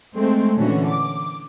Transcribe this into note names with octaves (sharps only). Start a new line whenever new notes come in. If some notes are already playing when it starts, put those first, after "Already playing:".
G#3 A3 C4
A#2 D3 E3 C#4 F#4
D6